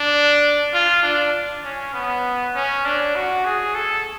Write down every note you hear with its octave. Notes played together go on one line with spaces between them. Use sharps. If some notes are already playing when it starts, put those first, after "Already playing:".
Already playing: D4
F4
D4
C#4
B3
C#4
D4
F#4
G#4
A4